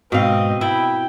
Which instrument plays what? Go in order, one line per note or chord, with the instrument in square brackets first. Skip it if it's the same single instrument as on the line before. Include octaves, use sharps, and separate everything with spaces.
[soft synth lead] G#2 [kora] B2 F5 [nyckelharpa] C4 D#5
[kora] E4 [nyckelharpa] G5 [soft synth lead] B5